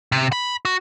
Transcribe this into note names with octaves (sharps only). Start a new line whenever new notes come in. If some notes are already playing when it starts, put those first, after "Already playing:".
C3
B5
F#4